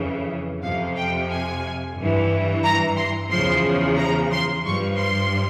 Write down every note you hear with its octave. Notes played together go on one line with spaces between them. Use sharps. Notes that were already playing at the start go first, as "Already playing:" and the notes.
Already playing: F2 C#3 E3
F2 C3 F3 F5
G5
G#5
G2 E3
A#5
C6
E2 C#3 F3 C6
A#5
C6
G2 F3 C#6
C6